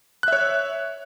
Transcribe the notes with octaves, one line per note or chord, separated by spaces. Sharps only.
C#5 E5 F#6